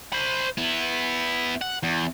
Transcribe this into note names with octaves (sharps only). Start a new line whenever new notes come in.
C5 B5
B3 E4
F#5
E2